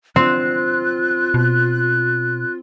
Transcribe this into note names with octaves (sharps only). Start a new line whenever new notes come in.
C4 F4 F#6
B2